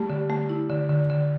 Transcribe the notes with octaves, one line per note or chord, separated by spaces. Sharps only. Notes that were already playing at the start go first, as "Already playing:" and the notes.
Already playing: G3 A3
D3
A3
E4
D3
D3
D3